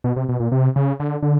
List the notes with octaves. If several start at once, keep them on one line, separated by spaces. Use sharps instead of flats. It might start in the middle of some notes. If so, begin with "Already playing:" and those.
B2
C3
B2
A#2
C3
C#3
D3
D3